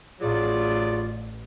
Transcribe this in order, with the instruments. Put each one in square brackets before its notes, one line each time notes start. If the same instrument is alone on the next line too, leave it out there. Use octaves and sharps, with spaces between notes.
[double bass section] A1 [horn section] F#3 D5 [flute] F4 [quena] G#4